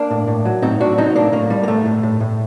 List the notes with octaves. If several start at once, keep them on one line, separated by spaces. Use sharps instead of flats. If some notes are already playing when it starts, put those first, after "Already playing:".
Already playing: A#3 D4
A2
A2
F#3
A2 C4 D#4
A2 D4 F#4
F#3 C4 D#4
A2 A#3 D4
A2 A#3
G3
A#3
A2 A3
A2
A2
A2